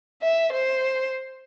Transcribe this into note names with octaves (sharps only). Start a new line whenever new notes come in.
E5
C5